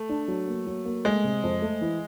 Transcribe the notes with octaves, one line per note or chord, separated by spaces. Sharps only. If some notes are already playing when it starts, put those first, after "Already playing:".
Already playing: A3
D4
F#3
A#3
F#3
A#3
G#3 A3
C3
F2
A3
E3